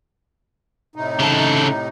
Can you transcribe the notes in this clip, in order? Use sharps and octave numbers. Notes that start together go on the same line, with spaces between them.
A2 C3 D#4
C#3 A4